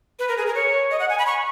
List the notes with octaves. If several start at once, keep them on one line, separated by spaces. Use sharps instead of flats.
B4
A#4
G#4
A#4
C#5
D#5
F#5
G#5
B5
C#6